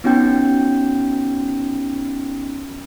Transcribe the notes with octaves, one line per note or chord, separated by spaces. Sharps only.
B3 C#4 D#4 F#4 G5 G6